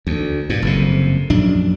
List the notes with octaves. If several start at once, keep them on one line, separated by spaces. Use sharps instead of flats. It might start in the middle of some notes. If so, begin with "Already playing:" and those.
D2
G2 A#2
F#1 F2 C3
A#1 F#2 D4